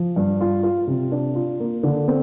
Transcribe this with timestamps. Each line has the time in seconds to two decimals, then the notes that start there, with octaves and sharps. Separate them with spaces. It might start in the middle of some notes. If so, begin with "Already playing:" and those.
Already playing: F3
0.16 G2
0.41 F4
0.63 F4
0.87 C3
1.12 D4
1.35 F4
1.60 A#3
1.83 D3
2.08 C4